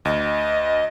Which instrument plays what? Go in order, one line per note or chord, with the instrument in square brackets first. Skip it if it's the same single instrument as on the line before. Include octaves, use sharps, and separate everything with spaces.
[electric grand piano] D2 [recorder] D#5